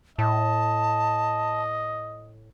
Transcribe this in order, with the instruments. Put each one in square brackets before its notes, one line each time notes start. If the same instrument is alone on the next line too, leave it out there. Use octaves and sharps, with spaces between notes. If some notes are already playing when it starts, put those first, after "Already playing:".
[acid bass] A2 [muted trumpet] D#5 [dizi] A5